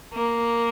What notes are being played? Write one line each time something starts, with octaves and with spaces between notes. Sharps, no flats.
A#3